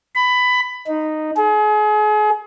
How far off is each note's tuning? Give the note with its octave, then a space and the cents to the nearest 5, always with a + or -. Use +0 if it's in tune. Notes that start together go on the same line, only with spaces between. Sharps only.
B5 +15
D#4 -10
G#4 +35